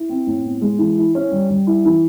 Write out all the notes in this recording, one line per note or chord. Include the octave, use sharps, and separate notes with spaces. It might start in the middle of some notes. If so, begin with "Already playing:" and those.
Already playing: E4
C4
A2
B3
G#3
E3
E4
C#4
G3
G3
E4
E3